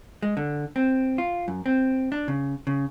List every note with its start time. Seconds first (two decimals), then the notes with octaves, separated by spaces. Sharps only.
0.22 G#3
0.37 D3
0.76 C4
1.18 F4
1.48 F#2
1.66 C4
2.12 D4
2.28 C#3
2.67 C#3